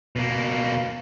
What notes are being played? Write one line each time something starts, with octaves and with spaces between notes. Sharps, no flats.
B2 A#3